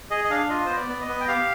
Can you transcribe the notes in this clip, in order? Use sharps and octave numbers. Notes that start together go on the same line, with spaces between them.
G#4 D#5
D#5
D4 F5
F4 D#5
B3 C5
D5
B3
D#5
B3
G5
G4 F5